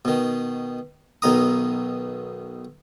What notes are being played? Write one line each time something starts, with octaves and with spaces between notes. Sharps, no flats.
B2 D#3
B1 B2 D#3 A#5 D#6